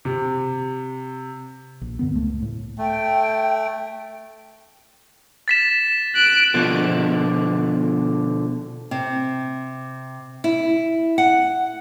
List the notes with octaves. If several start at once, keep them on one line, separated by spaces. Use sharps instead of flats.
C3
A#1
F#2 D3 B3
C#2 A3
A2
A3 G5
A6 B6 E7
F#6 D7
B2 D3 F3
C3
E4
F#5